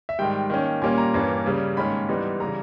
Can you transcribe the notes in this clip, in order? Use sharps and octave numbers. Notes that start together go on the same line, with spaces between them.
E5
G#2 D#3 G3 G5
D#3 A#3 C#4
A#2 G3 A#3 C#4 G#5
A#5
G2 E3 A#3 C#4
C#3 G3 C#4
G#2 D#3 A#3 C#4 B5
G#2 E3 G3 B3 D#4
C#3 E3 G3 A#5